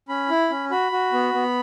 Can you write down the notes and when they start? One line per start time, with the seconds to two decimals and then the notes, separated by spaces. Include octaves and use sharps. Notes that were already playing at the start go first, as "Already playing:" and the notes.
0.09 C#4 B5
0.30 E4
0.51 C#4
0.71 F#4 B5
0.92 F#4
1.13 B3
1.34 B3